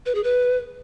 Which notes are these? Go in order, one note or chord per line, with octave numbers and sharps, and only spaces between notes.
B4
G#4
B4